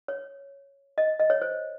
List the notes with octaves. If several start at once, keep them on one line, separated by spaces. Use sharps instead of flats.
C#5
D#5
D#5
C#5
C5